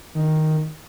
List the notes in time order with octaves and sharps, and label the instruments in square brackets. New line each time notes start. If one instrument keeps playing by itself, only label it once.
[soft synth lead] D#3